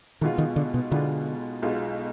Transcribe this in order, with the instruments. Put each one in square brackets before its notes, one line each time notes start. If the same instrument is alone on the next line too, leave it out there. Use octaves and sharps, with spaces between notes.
[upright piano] B1 B2 G#3 B3 F4 [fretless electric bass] D#3
[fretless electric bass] D#3
D3
B2
[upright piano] B1 B2 G#3 B3 F4 [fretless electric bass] D3
[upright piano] B1 B2 G#3 B3 F4